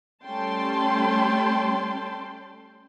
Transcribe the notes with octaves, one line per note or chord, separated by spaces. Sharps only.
G3 A3 C#4 G5 A5 C6